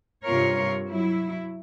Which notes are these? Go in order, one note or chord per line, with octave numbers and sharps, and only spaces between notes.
G2 C3 F4 A#4 C#5
F#3 E4